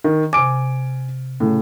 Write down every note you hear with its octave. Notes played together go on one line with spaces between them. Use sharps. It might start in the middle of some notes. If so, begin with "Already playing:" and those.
D#3
C3 G#5 D6 D7
A2 C#3